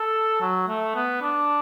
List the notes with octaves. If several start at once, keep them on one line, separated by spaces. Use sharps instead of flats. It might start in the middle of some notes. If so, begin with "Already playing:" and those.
Already playing: A4
F#3
A3
B3
D4